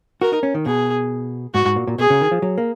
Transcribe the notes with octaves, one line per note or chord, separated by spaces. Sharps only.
F#4 A#4
D#4
C#4
D#3
B2 G#4
G#2 F#4
G#2
A#2
A#2
B2 G#4
C#3
D#3
F3
F#3
A#3